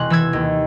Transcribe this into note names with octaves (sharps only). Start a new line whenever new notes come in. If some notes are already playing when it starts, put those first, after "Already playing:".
Already playing: E1 C3 G#5 C6 F#6
E3 E6 G#6
D#2